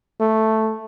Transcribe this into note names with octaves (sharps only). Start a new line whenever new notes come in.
A3